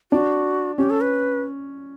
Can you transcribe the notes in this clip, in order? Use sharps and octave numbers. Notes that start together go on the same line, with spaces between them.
D4 F#4
C#4 G4
A4
B4